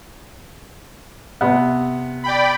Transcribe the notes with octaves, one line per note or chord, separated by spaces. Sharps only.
C3 B3
D5 G5 B5